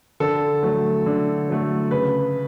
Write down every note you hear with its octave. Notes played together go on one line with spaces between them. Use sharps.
D3 A4
F#3 A3
D3
F#3 A3
C#3 B4